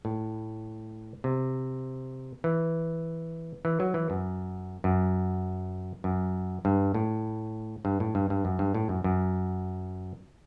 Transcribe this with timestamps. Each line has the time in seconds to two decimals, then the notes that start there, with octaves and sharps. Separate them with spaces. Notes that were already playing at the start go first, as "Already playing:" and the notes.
0.05 A2
1.24 C3
2.44 E3
3.65 E3
3.80 F#3
3.94 E3
4.10 F#2
4.84 F#2
6.04 F#2
6.65 G2
6.94 A2
7.85 G2
8.00 A2
8.15 G2
8.30 G2
8.45 F#2
8.59 G2
8.74 A2
8.89 F#2
9.04 F#2